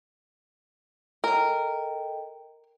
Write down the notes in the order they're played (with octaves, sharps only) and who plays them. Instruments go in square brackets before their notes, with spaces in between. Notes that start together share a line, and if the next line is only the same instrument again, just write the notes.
[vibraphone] A4 D#5 G5 [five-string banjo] A#4